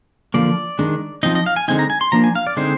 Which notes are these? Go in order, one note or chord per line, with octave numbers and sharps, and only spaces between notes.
D3 F3 A#3 D5
D#3 G#3 D4
F3 C4 D#4 D#5
D#5
F5
G#5
D3 G#3 C4 D#4 G#5
A#5
G#5
C6
F3 A#3 D4 A#5
G#5
F5
D5
D3 G#3 C4 D#4 C5